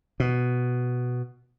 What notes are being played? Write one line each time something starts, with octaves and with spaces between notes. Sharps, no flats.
B2